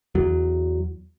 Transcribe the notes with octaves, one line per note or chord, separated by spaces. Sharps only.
E2 F#3